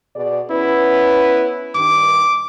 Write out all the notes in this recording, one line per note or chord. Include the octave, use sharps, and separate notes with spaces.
B2 G#4 D5
B3 C#4 E4 B4
G2 D#3 D6